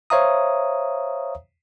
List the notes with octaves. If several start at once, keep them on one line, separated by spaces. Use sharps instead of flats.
C5 C#5 E5 F5 A#5 D#6